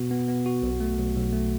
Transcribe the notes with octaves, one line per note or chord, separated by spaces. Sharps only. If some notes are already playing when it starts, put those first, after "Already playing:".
Already playing: B2 B3 F#4
B3
B3
F#4
B1
A3
B1
B1
A3